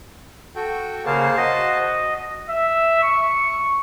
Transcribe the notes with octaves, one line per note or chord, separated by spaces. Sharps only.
F#4 A4 G5
C#3 A#3 C5 A5
F#4 D#5
E5
C#6